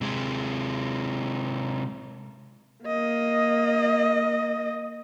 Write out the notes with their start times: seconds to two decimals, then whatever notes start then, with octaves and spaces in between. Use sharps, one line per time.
0.01 C3 G#3
2.85 A#3 D#5